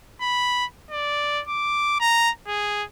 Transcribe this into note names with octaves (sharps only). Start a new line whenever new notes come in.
B5
D5
D6
A#5
G#4